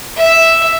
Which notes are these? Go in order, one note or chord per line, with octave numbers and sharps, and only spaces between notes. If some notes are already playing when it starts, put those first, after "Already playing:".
E5